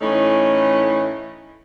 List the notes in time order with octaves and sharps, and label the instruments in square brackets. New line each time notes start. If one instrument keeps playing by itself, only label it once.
[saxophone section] A2 E3 A3 C#4 D#4 E4